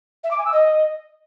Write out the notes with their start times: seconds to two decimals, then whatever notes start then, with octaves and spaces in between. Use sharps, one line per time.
0.24 E5
0.31 D6
0.38 G#5
0.45 E6
0.53 D#5